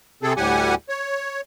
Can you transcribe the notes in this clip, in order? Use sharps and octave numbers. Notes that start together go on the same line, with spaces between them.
C3 C4 G#4 A4
D2 A2 G3 G4 F#5 G#5
C#5